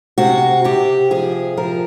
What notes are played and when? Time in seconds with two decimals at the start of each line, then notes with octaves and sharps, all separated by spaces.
0.18 C3 F#4
0.64 C3 G4
1.11 F3 G#4
1.57 F3 A#4